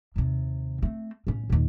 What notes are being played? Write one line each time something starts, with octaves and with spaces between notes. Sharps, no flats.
D#2 C3
A3 C4
A2 C#4
D#2 A#2